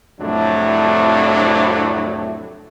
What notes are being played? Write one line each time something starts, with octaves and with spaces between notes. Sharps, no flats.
C2 F2 A2 F#3 A3 D4